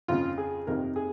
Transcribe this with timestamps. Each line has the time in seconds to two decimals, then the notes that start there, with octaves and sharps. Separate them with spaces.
0.08 F2 C#3 F4
0.38 G#4
0.67 F2 C3 D#3 A#4
0.96 G#4